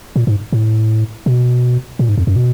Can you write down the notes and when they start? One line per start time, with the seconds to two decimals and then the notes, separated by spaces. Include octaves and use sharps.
0.16 A#2
0.27 G#2
0.52 A2
1.26 B2
1.99 A#2
2.09 G#2
2.17 F2
2.27 F#2
2.36 B2